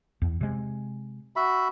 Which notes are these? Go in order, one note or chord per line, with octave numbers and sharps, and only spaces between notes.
E2
C3 G#3
F#4 E5 B5